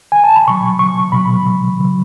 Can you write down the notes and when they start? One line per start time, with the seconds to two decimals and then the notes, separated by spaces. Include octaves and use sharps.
0.12 G#5
0.24 A5
0.36 B5
0.48 B2 F#3 C#6
0.79 C#6
1.12 B2 F#3 B5
1.77 C#3 F#3